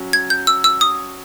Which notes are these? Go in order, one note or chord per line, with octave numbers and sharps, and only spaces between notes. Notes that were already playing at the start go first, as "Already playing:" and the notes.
Already playing: F#3 C#4
G#6
G6
E6
E6
D#6